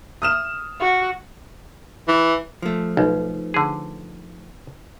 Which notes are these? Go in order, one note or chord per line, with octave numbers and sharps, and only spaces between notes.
D#6 F6 E7
F#4
E3
F3 A3
B1 D#4 B4
D3 G#4